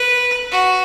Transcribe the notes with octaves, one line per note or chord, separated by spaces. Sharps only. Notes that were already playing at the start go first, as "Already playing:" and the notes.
Already playing: B4
F#4